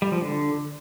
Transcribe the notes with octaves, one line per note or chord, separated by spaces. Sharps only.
G3
F3
D3